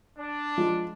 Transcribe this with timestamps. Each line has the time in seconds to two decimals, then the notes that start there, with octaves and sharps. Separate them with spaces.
0.17 D4
0.58 F3 G#3 F4